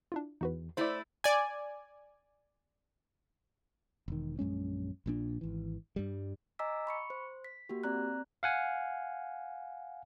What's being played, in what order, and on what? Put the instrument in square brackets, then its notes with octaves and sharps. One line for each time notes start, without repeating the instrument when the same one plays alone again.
[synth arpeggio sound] D4 E4 F4
[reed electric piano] E2 [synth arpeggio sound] D#4 F#4 B4
[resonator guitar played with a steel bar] A3 E4 [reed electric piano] C5 D5
[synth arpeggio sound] D5 G#5
[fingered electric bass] E1 D#3
A#1 F#2 G#3 C#4
A#1 A#2 D4
G#1 E3
G2 G3
[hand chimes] D#5 G#5 A#5 D6 E6 B6
B5 C#6 C#7
C5
B6
A#3 F#4 G4
C4 D5 A#5 F#6
[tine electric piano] F5 F#5 G#5